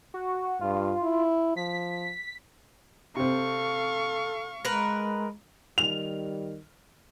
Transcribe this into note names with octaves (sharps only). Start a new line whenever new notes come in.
F#4
G2 F4
E4
F3 B6
C3 C4 A4 F5 C#6
G#3 A#4 B4
D#3 G3 F7